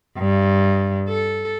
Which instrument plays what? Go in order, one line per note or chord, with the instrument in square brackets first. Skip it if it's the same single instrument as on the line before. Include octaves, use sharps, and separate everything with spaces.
[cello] G2
A4